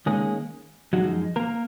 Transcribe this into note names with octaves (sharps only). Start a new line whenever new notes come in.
D#3 G#3 A#3 C#4 G#4
F#2 F3 F#3 G#3 D#4 F#4
A#3 A#4